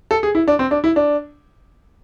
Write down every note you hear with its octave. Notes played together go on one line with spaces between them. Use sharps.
A4
G#4
E4
D4
C4
D4
E4
D4